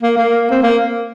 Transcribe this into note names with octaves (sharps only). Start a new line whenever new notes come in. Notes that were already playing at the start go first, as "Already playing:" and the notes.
A#3
A#3
C4
A#3